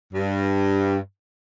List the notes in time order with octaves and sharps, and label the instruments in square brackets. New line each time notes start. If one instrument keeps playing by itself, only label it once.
[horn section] G2